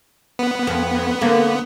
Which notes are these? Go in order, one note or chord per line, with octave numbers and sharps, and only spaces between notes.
B3
F2
D3 A3 A#3